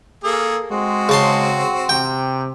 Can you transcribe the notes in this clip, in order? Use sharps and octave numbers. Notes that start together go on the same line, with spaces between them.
A#3 G#4 A4
G#3 C4 F#4
C#3 A5 C6
C3 G5